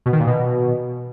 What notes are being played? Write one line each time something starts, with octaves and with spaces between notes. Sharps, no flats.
B2
D#3
A#2
B2